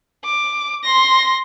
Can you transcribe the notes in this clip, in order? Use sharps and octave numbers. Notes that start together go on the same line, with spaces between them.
D6
C6 A#6